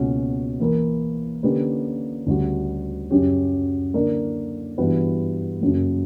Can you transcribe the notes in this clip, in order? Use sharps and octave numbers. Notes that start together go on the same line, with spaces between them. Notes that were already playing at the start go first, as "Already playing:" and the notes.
Already playing: C#2 B2 A#3 C#4 F#4
E3 A#3 E4 A#4
D3 A#3 C#4 G4 B4
D2 C#3 G3 C#4 F#4
F#2 C#3 F#3 C#4 G4
D3 A#3 D4 A#4
G2 E3 B3 F#4 B4
F#2 C#3 F#3 A#3